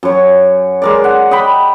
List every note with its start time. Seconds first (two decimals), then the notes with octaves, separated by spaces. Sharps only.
0.03 F#2 C#5
0.82 G#3 A#4 D5
1.04 F#5
1.31 D#5 G5 B5